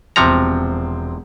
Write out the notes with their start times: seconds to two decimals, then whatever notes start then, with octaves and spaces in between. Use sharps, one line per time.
0.16 E1 C3 F3 C4 A#5 C#7